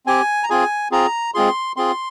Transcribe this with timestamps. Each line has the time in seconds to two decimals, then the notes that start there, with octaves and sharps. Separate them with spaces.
0.06 C4 G4 G#5
0.43 A#5
0.50 C4 F4 G#4 G#5
0.91 C4 F4 G#4 A#5
1.34 G#3 C4 F4 G#4 C6
1.77 C4 F4 G#4 C6